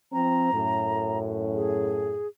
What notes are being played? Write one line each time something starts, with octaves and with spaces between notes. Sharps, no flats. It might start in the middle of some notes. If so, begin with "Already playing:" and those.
F3 C4 A#5
F#2 A2
G#4